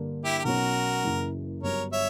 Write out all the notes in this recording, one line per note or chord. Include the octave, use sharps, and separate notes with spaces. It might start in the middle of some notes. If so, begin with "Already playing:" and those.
Already playing: G2 D3 A#3 D4
E4 G4
G4
B1 B2 F#3 C#4 F#4 A#4
F#1 F#2 C#3 E3 A#3
G1 G2 F#3 A#4 C#5
C#5 E5